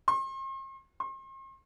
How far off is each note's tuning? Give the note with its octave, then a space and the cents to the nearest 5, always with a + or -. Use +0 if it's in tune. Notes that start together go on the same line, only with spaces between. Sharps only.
C6 +45
C6 +45